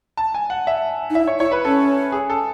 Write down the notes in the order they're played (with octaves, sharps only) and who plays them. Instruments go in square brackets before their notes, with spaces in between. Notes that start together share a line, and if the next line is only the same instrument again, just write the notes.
[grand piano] A5
G#5
F#5
E5
[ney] D#4
[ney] E4 [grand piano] E5
[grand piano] C#5
[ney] E4 [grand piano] C#5
[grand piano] B4
[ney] C#4 [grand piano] A4
[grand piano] G#4
A4